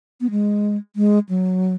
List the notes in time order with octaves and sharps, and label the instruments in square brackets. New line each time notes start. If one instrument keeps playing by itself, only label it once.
[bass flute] B3
G#3
G#3
F#3